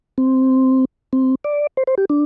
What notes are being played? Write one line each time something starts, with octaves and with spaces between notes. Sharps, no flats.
C4
C4
D5
C5
C5
G4
D4